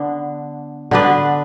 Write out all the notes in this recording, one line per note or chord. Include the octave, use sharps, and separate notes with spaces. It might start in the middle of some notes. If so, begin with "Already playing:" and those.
Already playing: D3 B3 D4
D3 B3 D4 B4